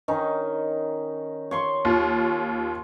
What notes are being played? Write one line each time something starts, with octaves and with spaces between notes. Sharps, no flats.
D#3 C#4 D#4
C#5 C6 C#6
D#2 F4